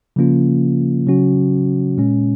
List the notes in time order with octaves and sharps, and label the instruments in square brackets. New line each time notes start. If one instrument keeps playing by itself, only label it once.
[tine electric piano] C#3 F3 A#3 C#4 F4
C#3 F#3 C#4 F#4
A#2 G#3 C#4